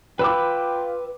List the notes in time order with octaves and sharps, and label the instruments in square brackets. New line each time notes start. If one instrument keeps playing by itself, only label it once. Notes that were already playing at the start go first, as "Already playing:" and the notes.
[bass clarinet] F4 [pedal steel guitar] B4 E6 [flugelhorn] G5 [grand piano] B5 D6